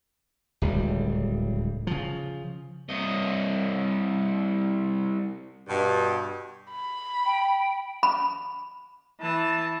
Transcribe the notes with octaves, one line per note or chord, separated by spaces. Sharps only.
D1 C#2 G3
C#3 F3
C2 D#5
G2 B2
B5
G5
B5
E3 A5